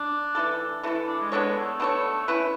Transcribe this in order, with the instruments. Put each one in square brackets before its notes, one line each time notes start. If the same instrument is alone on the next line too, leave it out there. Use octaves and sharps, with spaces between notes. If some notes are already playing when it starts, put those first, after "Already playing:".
Already playing: [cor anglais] D4
[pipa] E3 A3 E4 A4
E3 A3 E4 A4
[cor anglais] D4
G#3
[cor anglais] G#3 [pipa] B3 D4 A4 C#5
[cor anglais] A3
[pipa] B3 D4 A4 C#5
C#4 E4 B4